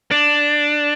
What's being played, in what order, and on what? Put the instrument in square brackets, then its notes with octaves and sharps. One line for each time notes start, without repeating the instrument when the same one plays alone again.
[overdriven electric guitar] D4